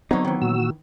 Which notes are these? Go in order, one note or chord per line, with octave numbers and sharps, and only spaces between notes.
D3 F#3 B3 C4 D#4 C#5
D#3 E3
A#2 F#4 E6